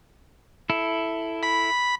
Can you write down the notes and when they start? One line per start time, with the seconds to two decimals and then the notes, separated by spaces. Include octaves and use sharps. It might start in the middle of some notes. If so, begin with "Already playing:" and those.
0.70 E4 A4
1.43 B5